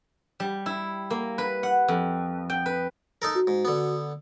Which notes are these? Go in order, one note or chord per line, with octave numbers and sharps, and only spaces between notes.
G3
E4
A#3
B4
F#5
F2
G5
B4
D#4 A4 A#4
F#4
G#2
D3 B3